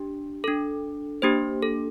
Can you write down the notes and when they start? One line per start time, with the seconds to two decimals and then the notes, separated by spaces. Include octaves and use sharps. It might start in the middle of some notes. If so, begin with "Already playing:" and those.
Already playing: D4 G4
0.44 D4 A4
1.22 A#3 D4 G4 C5
1.62 A4